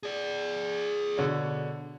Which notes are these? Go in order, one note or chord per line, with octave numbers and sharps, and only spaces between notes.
G#4 D5
B2 D3 C#5